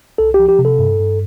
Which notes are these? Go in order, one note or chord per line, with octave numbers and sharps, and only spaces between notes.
C2 A4
G4
F3
G4
C3
A4
G2
G2